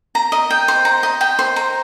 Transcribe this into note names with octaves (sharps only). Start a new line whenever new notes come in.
A#5
D#5
G5
C5
A#5
D#5
G5
C5
A#5